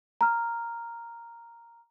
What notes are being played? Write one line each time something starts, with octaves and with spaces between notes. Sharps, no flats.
A#5 F6